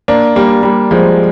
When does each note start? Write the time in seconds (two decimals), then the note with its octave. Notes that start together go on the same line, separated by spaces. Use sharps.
0.08 A#3 D4
0.36 G3 A#3
0.63 G3 A#3
0.91 F3 G#3